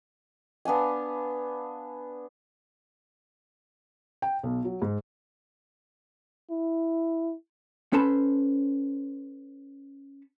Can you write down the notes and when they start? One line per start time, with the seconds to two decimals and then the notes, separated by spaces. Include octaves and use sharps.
0.65 B3 D4 F5 G#5
4.22 G5
4.43 B1
4.64 F#3
4.82 G#2
6.51 E4
7.93 C#4 A4 B4 C5 A5 B5